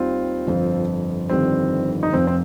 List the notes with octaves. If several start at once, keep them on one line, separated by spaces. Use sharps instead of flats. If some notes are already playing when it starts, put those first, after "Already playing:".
Already playing: D#2 D#3 G3 C4 F4
G1 F2 F3
G1 F2 D#3 G3 C4
D#4
F1 F2 F3 C4
C4